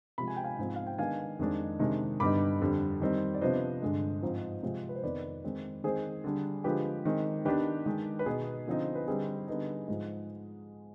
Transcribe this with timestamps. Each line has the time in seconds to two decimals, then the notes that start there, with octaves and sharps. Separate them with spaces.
0.18 C3 F3 G#3 B5
0.28 G#5
0.36 G5
0.44 F5 G#5
0.59 G#2 F3 G#3 C4
0.76 F5
0.87 G5
0.98 D#3 G#3 B3 D4 F5 G#5
1.39 F2 D#3 G#3 D4
1.79 C3 D#3 G#3 D4
2.20 G2 D3 G3 B3 D#4 B5 D6
2.61 F2 D3 G3
3.01 D#3 G3 C4 D#4
3.34 D5
3.41 C3 F3 B3 D4 C5 D#5
3.82 G2 D3 G#3
4.22 G#2 F3 C4 D#4
4.63 C3 F3 G#3 C4
4.89 B4
4.95 C5
5.03 F2 D#3 B3 B4 D5
5.44 D#3 G#3 C4 D#4
5.84 D#3 G#3 C4 G#4 C5
6.24 D3 G3 D4
6.64 D3 F3 G#3 G4 B4
7.05 D#3 G#3 C4
7.45 D#3 B3 D4 G4 B4
7.86 D#3 G#3 D4
8.19 B4
8.26 B2 B3 D#4 G#4
8.67 D3 F3 C4 D#4
8.95 B4
9.08 D3 G3 C4 D#4 G#4
9.48 D3 G3 B3 D#4
9.88 G#2 F3 G#3